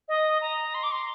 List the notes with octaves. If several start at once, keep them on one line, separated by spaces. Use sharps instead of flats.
D#5
A#5
C6
D6
C6